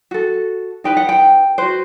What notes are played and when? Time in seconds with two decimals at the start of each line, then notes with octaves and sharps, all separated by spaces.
0.11 F#4 A4
0.84 D#4 G4 B4 G5
0.97 F#5
1.09 G5
1.58 F#4 B4 C5